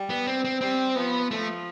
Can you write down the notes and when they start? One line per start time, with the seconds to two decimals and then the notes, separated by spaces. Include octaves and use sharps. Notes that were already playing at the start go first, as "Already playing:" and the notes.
Already playing: G3
0.10 B3
0.27 C4
0.45 C4
0.61 G3 C4
0.95 F3 B3
1.31 F3 A3